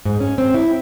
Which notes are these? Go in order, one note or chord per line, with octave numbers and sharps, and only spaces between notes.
G#2
C#4
C4
E4